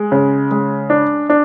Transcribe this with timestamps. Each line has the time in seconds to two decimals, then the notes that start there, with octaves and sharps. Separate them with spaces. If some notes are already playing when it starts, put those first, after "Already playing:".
Already playing: G#3
0.12 C#3
0.51 G#3
0.90 D4
1.30 D4